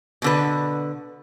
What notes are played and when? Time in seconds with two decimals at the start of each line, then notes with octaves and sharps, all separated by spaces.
0.22 B2 D3 B4